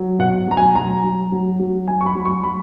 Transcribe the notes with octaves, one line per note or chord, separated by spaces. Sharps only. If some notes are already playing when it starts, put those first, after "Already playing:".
Already playing: F#3
B2 F#5
F#3 A#5
G#5
F#3 A#5
F#3
F#3
F#3
F#3 G#5
C#6
B5
F#3
C#6
F#3 B5